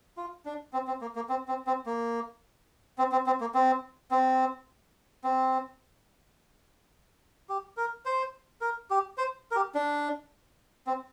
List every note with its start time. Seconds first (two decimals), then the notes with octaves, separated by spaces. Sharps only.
0.17 F4
0.45 D4
0.73 C4
0.87 C4
1.01 A#3
1.15 A#3
1.29 C4
1.48 C4
1.67 C4
1.86 A#3
2.98 C4
3.12 C4
3.26 C4
3.41 A#3
3.54 C4
4.11 C4
5.24 C4
7.49 G4
7.77 A#4
8.05 C5
8.61 A#4
8.90 G4
9.18 C5
9.51 A#4
9.55 G4
9.75 D4
10.87 C4